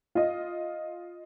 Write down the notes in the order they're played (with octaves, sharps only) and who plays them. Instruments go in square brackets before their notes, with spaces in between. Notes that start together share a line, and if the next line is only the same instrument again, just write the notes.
[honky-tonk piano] F4 D#5